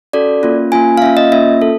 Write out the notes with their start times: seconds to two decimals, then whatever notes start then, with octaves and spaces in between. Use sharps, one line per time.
0.13 C#4 F#4 A4 D5
0.43 A#3 C#4 F4
0.72 A#3 C#4 F4 G#5
0.98 F5
1.02 A#3 C#4 F4 E5
1.17 D#5
1.32 A#3 C#4 F4 E5
1.62 A4